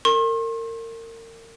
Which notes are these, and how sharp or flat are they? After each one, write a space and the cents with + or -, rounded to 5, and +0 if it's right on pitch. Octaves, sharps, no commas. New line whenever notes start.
A#4 -35 C6 +45